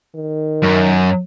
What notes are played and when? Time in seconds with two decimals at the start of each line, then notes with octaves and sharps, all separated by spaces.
0.15 D#3
0.62 F#2